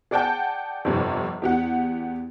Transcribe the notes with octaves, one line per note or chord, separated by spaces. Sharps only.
G#4 D5 F#5 G5 A5 G6
G1 F2 C3
E2 G4 F#5